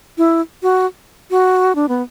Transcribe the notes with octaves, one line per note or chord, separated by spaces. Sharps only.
E4
F#4
F#4
D4
B3